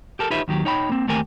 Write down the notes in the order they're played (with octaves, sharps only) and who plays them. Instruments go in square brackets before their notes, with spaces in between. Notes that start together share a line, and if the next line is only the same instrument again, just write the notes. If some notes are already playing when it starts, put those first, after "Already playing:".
[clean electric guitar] G4 A4 A#4
D#4 F4 G4 B4 C#5 E5
D#2 D#3 F#3 G4
D#4 C#5 G5 B5
A#3 C4
D#2 A3 C4 G4 A#4 G#5